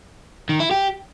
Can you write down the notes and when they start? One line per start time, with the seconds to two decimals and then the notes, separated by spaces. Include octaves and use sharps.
0.49 D#3
0.60 E4
0.71 G4